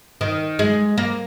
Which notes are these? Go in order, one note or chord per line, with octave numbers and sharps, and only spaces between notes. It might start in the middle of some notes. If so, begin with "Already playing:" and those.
D#3
G#3
A#3